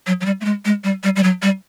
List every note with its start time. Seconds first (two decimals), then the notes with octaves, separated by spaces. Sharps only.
0.07 F#3
0.21 F#3
0.26 G3
0.41 A3
0.45 G#3
0.65 G#3
0.84 G3
1.03 G3
1.16 G3
1.23 F#3
1.42 G3